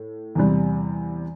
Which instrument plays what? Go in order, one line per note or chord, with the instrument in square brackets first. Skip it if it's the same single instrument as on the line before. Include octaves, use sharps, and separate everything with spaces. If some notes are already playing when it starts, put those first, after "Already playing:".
Already playing: [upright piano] A2
E2 C3 G3